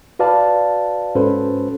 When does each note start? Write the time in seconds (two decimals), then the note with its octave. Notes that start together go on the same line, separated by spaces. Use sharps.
0.19 F#4 B4 D5 F5 A5
1.15 G#2 C#4 F#4 A4 B4 C5